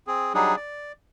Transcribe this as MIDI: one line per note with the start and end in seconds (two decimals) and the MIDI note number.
0.07 0.33 60
0.07 0.33 68
0.34 0.56 54
0.34 0.56 55
0.34 0.56 62
0.34 0.56 63
0.34 0.56 68
0.57 0.92 74